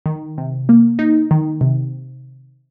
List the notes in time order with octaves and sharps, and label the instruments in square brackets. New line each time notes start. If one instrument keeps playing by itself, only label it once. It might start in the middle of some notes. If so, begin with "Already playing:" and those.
[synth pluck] D#3
C3
A#3
D#4
D#3
C3